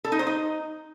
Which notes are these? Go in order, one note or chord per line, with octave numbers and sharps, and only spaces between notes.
A4
D#4
C5
D#4